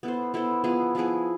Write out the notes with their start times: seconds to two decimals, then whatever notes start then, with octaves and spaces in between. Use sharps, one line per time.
0.03 B3 E4 A4 C5
0.34 B3 E4 A4 C5
0.64 F3 B3 E4 G#4
0.95 F3 B3 E4 G#4